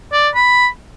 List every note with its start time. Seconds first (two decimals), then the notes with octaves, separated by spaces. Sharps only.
0.13 D5
0.35 B5